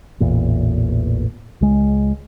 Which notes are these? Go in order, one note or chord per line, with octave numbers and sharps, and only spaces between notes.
A1 E2 A#2
C#2 G#3